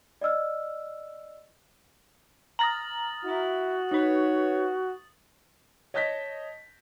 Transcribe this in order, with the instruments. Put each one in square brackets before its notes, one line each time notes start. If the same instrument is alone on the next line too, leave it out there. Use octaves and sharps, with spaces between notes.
[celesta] D5 D#5 E6 F6
[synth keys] A#5 F6 A#6 [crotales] D#6 A6 F#7
[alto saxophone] E4 [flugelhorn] F#4
[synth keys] D#4 B4 [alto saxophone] C#5
[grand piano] C#5 D#5 A5 G6 A#6 B6